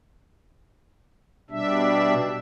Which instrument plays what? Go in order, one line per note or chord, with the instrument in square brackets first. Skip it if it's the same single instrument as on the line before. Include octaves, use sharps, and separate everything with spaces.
[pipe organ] B2 G3 D4 E5